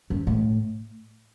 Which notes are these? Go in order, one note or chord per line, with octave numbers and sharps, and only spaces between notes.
F#2
A2